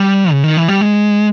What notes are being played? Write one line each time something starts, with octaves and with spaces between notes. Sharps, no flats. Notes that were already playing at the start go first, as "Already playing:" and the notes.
Already playing: G3
C#3
D#3
E3
G3
G#3